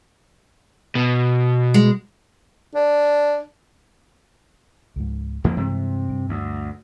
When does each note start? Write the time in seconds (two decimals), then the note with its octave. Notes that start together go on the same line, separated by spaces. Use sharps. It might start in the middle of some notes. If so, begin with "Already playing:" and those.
0.95 B2
1.74 G#3
2.75 D4
4.96 C#2 G#2
5.44 F2 F3 A#3
5.57 G2 C3 E3 G#3
6.10 G2
6.29 D2